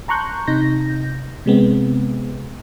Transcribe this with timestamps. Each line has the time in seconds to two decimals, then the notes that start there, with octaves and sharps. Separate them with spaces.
0.08 A5 A#5 C6 C#6 F#6 G6
0.47 C3 D#4 G6 A#6
1.46 C3 G#3 B3 C4